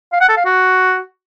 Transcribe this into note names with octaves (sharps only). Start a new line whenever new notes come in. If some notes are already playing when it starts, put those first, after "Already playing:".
F5
F#5
A4
F5
F#4